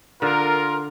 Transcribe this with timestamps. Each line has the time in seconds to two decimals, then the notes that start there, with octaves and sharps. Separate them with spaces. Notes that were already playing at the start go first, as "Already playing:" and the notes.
0.22 D3 F4 A#4